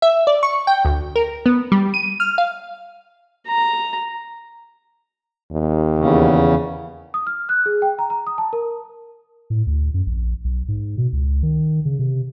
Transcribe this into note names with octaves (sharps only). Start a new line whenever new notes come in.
E5
D5
C#6
G5
D2
A#4
B3
G3
D#7
F6
F5
A#5
D#2
E2 C#3
D#6
F6
F#6
G#4
G5
A#5
A#5
D#6
A5
A#4
A2
D2
F#2
A#1
B1
G#2
B2
C#2
D#3
C#3
C3